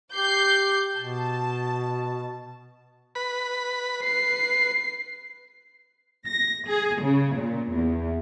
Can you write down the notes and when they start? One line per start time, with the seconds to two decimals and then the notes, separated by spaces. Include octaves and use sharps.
0.14 G4 D6 G6 C7
0.97 B2 A5
3.15 B4 B5
4.03 B4 C7
6.28 A#6
6.68 G#4
7.02 C#3
7.37 A#2
7.73 E2